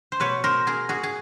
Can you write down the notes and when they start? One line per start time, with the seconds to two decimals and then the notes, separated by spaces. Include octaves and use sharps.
0.12 C5
0.20 B2 B4 C#5
0.44 A#4 C5
0.67 G#4 A#4
0.89 F#4 G#4
1.03 G#4